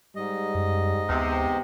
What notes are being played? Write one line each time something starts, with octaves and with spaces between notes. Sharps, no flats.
G#2 G3 D#5
F#2
D2 C3 B3